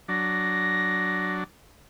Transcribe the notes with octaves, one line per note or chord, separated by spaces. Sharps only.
F#3 D4 A#6